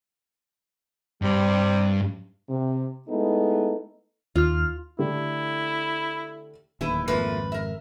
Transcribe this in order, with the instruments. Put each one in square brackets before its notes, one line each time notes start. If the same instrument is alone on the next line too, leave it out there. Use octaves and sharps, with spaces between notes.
[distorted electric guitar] G2 [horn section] C3 G3
[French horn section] C3
G#3 A3 B3 D#4 E4 A4
[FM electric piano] D#2 F6 [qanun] F4
[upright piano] D3 A3 G4 [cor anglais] E4
[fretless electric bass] D1 D#2 [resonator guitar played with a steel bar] E4 G4 B4
[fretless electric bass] G#1 F2 [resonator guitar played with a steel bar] F3 A3 A#3 [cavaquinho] B4
[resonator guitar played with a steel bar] A#4 E5